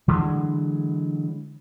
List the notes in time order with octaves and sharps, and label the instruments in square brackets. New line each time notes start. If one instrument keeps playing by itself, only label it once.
[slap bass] D3 E3 F#3 G#3